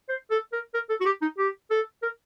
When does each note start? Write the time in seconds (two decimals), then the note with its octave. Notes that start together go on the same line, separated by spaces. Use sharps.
0.09 C5
0.31 A4
0.52 A#4
0.74 A#4
0.89 A4
1.00 F#4
1.05 G4
1.21 D#4
1.38 G4
1.71 A4
2.03 A#4